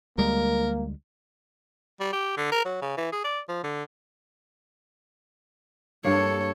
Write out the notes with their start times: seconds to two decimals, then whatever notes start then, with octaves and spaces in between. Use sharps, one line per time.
0.18 D2 G3 G#3 A#3 A#4
2.00 G3
2.13 G4
2.37 D3
2.52 A#4
2.65 F#3
2.82 C#3
2.98 E3
3.13 G#4
3.25 D5
3.49 F3
3.64 D3
6.04 G2 A#3 A4 C#5